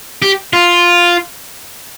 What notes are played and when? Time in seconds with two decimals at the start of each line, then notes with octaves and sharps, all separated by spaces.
0.22 G4
0.53 F4